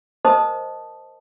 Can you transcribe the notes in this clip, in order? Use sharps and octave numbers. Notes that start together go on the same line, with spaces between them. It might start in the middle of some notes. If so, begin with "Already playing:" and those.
A#4 C5 D#5 A5 D#6